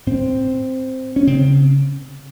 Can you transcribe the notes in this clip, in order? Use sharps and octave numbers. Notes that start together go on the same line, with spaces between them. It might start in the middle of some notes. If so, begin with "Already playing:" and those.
A2 C4
C#4
C#3 C4